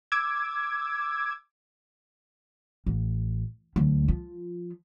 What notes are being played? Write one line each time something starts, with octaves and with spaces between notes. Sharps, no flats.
D6 E6 G#6
A1
D2 F#3
F3 F4